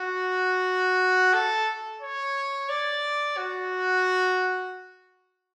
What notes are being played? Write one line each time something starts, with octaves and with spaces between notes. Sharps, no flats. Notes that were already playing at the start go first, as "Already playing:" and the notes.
Already playing: F#4
A4
C#5
D5
F#4